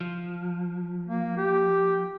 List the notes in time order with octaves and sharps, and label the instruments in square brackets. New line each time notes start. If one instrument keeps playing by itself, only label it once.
[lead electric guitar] F3
[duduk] A#3
G4